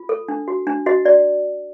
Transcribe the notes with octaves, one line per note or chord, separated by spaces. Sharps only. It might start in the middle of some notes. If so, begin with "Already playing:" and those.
Already playing: F4
A4
D4
F#4
D4
F#4 D#5
F#4 D5